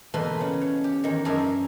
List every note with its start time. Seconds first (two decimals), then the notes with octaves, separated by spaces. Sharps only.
0.14 E2 B2 A3 A#3 B4 C6
0.37 C#3 G#4 B5
0.61 C#5
0.84 G4
1.04 E2 D#3
1.25 F#2 D4 G#4 A#4 E5